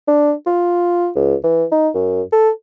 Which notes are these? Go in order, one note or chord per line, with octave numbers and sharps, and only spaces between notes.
D4
F4
C#2
E3
D#4
F#2
A4